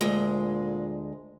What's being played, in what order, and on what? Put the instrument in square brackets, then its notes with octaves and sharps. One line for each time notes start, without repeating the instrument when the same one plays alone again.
[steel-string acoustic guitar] D2 G#3 [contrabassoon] A#2